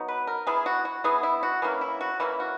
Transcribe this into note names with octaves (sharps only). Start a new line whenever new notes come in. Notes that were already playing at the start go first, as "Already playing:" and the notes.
Already playing: F#3 B3 D#4
B4
A#4
E3 B3 E4 G#4
F#4
F#4
E3 B3 E4 G#4
E4
F#4
E3 A#3 C#4 E4 G#4
E4
F#4
E3 A#3 C#4 E4 F#4
F#4